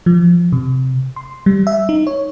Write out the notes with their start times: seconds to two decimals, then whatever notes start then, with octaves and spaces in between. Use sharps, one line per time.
0.06 F3
0.52 C3
1.16 C6
1.46 G3
1.67 E5
1.89 D#4
2.07 C#5